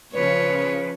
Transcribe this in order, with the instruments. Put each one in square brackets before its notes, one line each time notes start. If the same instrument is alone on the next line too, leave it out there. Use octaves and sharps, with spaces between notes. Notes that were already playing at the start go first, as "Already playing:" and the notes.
[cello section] C#3 F3 [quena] B4 [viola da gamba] C#5